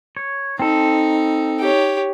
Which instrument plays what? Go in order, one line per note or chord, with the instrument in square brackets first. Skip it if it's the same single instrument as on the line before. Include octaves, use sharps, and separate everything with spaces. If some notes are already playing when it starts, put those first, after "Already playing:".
[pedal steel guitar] C#5
[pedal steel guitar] C4 A4 [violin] D#4
[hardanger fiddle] G4 C#5